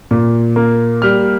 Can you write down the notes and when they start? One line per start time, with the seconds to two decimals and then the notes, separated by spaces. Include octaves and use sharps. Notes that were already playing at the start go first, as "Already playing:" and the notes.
0.11 A#2
0.56 A#3
1.02 G3 F6